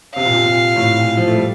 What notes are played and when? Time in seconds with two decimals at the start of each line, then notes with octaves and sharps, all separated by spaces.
0.16 C3 F5
0.25 A#2
0.34 C3
0.45 A#2
0.76 A2
0.96 A#2
1.17 F3
1.28 A3
1.36 G3